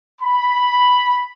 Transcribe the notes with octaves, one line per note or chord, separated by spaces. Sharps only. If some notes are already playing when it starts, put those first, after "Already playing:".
B5